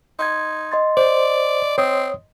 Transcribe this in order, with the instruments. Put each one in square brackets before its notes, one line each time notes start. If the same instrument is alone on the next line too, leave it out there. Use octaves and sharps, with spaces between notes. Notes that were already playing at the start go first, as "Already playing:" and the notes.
[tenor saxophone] D#4 [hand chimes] C6 G#6
[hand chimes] D#5 C6 A6
[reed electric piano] C5 [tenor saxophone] D5
[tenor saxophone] C4 [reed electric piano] C#5 D#6